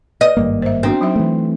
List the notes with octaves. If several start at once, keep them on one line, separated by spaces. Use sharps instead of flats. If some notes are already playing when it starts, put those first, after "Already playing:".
B4 D#5
G#1 G2 A#3
C5 E5
B3 C4 D4 F#4
F#3 D#4 E5
E3 A3